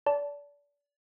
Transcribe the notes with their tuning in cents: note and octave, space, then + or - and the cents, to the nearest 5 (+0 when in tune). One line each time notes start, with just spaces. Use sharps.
D5 -30 A5 +0